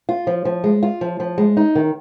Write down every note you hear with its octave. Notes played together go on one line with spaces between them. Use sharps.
F4
F3
F3
G#3
F4
F3
F3
G#3
D#4
D#3